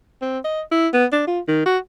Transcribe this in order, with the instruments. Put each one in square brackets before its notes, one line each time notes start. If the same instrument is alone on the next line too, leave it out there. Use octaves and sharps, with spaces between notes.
[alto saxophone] C4
D#5
E4
B3
D4
F4
D#3
F#4